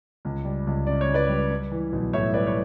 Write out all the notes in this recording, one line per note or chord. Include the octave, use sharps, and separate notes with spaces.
C#2
G3
C#2
C#3 D5
C#5
C#2
B4 D5
G3
G3
E3
B1
A2 C#5 E5
G3 B4 D5
C#5